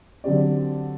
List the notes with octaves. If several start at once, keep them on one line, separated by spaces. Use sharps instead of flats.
D3 F#3 C4 G4 D5